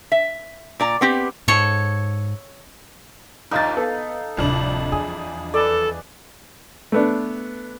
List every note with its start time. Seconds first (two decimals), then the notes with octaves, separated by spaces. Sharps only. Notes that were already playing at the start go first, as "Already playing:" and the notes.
0.12 E5
0.80 A#2 D5 A#5
1.01 B3 C4 G4
1.48 G#2 A4 C#5
3.51 A#1 D#2 D#4 F5 A#5 A6
3.77 B3 A4 F5
4.37 D1 C2 F2 C3 D4
4.92 E2 G#4
5.54 A4 B4 D5
6.92 A3 B3 D4